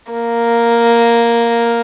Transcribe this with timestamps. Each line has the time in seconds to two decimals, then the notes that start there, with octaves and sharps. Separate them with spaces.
0.12 A#3